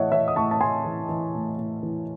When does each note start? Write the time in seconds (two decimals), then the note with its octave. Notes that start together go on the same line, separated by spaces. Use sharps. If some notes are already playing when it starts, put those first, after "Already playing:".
Already playing: A2 E3 C#5 D#5 E5 F#5 A5
0.12 E3 C#5 E5
0.28 D#6
0.36 A2 A5 C#6
0.51 A5
0.61 A2 G#5 C6
0.85 E3
1.09 E3
1.34 A2
1.58 A2
1.83 E3